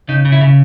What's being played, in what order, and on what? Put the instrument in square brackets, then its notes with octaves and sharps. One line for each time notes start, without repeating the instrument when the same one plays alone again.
[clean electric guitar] C#3 D#4
C#3
E4
C#3